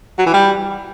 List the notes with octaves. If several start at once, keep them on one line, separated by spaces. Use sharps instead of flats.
F#3
E3
G3